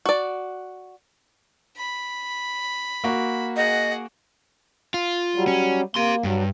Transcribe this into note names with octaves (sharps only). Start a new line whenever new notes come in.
F#4 D5
B5
A#3 F#4
G#4 D#5 F#5
F4
F#3 G3
C#4
A#3 G4 C6
G2 F#3